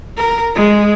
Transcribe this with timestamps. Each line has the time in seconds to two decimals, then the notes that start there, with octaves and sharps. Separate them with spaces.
0.17 A#4
0.55 G#3